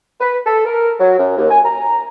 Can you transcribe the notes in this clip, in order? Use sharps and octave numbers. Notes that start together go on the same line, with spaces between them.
B4
A4
A#4
F#3
F#2
D#2
G#5
A#5